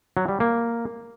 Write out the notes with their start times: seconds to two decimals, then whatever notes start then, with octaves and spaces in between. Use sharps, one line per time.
0.17 F#3
0.28 G3
0.40 A#3